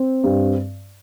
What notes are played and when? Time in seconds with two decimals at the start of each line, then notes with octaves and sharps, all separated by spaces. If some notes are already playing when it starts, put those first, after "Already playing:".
Already playing: C4
0.24 G2